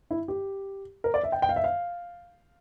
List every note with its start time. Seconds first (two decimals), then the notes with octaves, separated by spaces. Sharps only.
0.11 E4
0.28 G4
1.04 A#4
1.14 D5
1.24 E5
1.32 G5
1.42 G5
1.49 F5
1.56 E5
1.64 F5